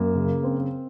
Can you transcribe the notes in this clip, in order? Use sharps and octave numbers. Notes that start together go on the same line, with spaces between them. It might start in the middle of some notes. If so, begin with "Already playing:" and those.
Already playing: F#2 A#3
C#3
C4